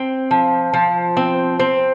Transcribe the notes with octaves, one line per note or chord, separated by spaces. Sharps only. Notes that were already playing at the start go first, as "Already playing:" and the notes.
Already playing: C4
F3
F3
C4
C4